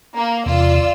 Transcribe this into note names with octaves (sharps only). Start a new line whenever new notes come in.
A#3
E2 C3 F4 D5 E6